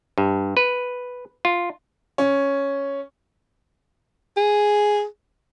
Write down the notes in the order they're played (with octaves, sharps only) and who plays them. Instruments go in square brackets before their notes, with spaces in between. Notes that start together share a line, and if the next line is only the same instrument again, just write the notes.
[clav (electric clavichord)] G2
B4
F4
[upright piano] C#4
[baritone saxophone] G#4